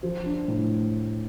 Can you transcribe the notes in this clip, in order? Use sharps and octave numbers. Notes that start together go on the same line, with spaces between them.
F3
D4
A2